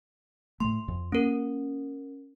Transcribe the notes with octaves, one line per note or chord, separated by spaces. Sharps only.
A2 A3 C6
F2
A#3 C#4 A#4